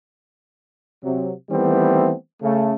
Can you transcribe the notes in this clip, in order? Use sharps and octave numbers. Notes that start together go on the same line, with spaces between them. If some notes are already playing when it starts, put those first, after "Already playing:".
C3 F#3
D#3 E3 G3 A3 B3 C4
C#3 A3